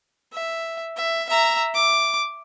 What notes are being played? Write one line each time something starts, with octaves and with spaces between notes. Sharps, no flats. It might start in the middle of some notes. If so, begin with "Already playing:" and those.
E5
E5
E5 A#5
D6